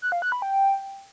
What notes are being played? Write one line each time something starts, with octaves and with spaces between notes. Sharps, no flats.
F#6
F5
F#6
B5
G5